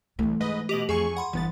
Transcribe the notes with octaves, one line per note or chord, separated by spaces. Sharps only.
C2 E3 A3
G#2 B4 D#5
B2 G4 D#5 D6 F7 F#7
F2 G#4 G#5 C#6
F#5 B5 C6
G1 E3 B3 A6